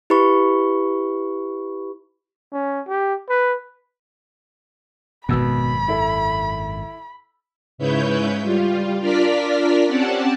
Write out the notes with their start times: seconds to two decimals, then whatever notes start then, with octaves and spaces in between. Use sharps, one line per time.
0.10 E4 G4 B4 B5 C#6
2.53 C#4
2.88 G4
3.29 B4
5.29 G#1 F#2 B2 B5 E6
5.88 E4 A4
7.78 G#2 C#3 E4 B4 C#5 G6
8.43 G3 F4
9.00 D4 F4 A#4 D5 F6 B6
9.88 C4 C#4 G4 D5 F#5 A5